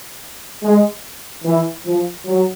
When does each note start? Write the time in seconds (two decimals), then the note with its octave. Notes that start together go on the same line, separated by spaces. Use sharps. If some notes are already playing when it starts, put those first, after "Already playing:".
0.62 G#3
1.43 E3
1.84 F3
2.25 F#3